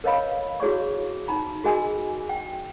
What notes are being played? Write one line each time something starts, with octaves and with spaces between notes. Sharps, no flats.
A#4 B4 C#5 D#5 F5 B5
E4 F#4 G#4 C#5 D5 C#6
D#4 A#5 B5
F#4 G#4 A#4 D#5 G#5
G5